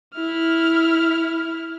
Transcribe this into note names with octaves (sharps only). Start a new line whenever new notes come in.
E4 F6